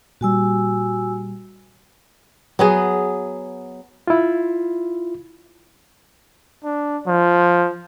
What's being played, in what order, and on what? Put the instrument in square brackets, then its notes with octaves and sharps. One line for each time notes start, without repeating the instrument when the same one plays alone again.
[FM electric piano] A#2 G3 [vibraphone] F#4 G#5 E6
[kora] F#3 B3 G#4
[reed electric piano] E4 F4
[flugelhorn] D4
F3